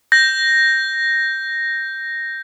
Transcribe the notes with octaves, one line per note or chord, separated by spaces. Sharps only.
G6 A#6